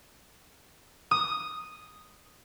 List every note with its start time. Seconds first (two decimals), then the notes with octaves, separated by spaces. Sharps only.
1.11 D#6